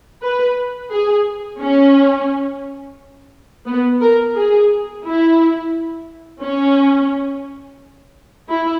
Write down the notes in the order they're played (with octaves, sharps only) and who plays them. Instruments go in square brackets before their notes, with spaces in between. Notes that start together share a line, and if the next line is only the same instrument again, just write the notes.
[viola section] B4
G#4
C#4
B3
A#4
G#4
E4
C#4
E4